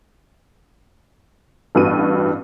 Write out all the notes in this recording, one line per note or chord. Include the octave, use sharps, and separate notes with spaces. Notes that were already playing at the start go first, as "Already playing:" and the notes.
A1 G2 B3 F#4 D#7